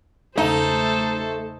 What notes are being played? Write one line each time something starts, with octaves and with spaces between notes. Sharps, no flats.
E2 C#3 A3 D#4 A4 C5